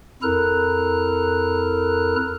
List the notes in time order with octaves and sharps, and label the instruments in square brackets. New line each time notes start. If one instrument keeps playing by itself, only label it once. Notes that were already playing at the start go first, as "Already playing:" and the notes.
[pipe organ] F2 E4 A4 A#4 A#5 F#6